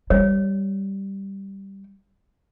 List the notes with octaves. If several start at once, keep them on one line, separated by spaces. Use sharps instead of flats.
G3 C#5